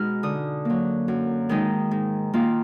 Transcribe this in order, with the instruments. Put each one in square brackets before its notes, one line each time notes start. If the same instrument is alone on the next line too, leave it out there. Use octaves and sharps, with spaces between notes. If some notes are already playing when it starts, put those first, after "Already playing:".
Already playing: [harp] B2 G#3 D#4 F6
D3 D#6
F#3 A#3
F#2
D#3 G#3 D#4
G#2
D#3 A#3 F4